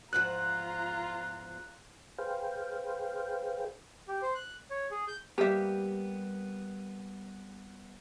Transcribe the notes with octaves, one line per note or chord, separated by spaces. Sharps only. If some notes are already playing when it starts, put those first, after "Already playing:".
E2 G#2 F3 F4 A#5 F#6
G#4 B4 C5 F5 G5
G4
C5
F#6
C#5
G#4
G6
G3 A#3 B3 G4 E5